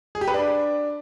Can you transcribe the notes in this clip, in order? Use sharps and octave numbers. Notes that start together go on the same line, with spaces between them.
G#4
G4
B4
D4